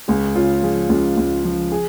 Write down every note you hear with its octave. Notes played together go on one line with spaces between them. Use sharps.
C#2 G#4
C#3 F4
F3 G#4
C#2 F4
C#2
F3
G#4